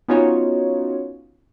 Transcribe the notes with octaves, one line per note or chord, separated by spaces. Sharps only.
B3 C#4 D#4 F4 F#4 C#5